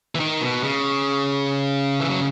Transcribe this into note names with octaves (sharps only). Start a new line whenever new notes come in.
E3
D#3
B2
C#3
E3
F#3